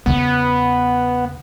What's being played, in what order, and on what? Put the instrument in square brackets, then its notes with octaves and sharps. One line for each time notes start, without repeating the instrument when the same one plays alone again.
[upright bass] E2 C#3 [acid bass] B3